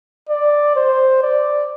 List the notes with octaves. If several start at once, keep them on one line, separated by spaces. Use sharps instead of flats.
D5
C5
D5